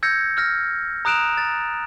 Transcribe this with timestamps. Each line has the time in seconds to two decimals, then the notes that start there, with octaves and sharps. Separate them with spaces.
0.03 E6 G6 G#6 A#6 C#7
0.37 E6 F6 A#6
1.05 A#5 D#6 F#6 D7 E7 F7
1.37 A6